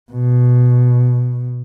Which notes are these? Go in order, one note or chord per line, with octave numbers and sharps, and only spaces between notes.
B2